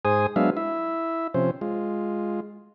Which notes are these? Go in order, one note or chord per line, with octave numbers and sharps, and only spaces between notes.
G#2 G#4 C5 G#5 D#6
F#3 G#3 B3 D4 E5 F5
E4 E5
C3 F3 C#4 C5
G#3 F4